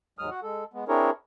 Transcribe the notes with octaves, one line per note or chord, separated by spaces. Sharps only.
D#2 G#2 F#3 G#3 D#6 F6
F#4 F#5
G#3 A4
G#3 B3
C4 D4 E4 G#4 A#4 C#5